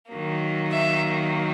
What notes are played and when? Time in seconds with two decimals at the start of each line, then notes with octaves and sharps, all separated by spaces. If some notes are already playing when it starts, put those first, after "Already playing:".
0.11 D#3 F#3 A#3
0.72 E5